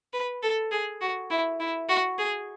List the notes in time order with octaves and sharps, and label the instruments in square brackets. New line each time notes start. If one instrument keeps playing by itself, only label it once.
[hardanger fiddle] B4
A4
G#4
F#4
E4
E4
F#4
G#4